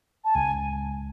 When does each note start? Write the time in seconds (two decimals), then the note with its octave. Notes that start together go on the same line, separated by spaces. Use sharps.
0.25 A5
0.35 C#2 G#5